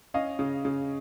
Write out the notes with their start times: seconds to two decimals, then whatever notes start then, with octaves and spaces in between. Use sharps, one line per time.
0.14 C#4 D#5 F5
0.39 C#3
0.65 C#3